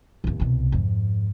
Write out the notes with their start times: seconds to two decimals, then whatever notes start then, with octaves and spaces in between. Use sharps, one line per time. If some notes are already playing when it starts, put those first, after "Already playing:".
0.24 A1 D#2
0.40 C2 B2
0.72 F2 G#2